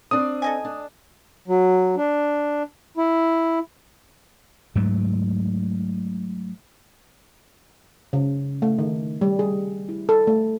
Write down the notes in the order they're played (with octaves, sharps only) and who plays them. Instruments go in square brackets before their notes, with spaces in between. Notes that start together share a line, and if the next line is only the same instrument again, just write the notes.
[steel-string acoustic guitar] C4 D4 [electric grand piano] D#6
[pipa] A4 D#5 G#5
[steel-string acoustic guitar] D4
[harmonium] F#3
D4
E4
[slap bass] G#2 F#3 A3
[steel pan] C#3
A3
D#3
G3
G#4
E4
A4
A3